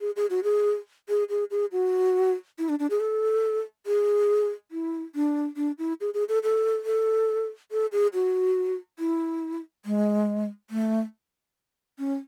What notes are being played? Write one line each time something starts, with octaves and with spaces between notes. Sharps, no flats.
G#4
G#4
F#4
G#4
G#4
G#4
G#4
F#4
E4
D4
D4
G#4
A4
G#4
E4
D4
D4
E4
G#4
G#4
A4
A4
A4
A4
G#4
F#4
E4
G#3
A3
C#4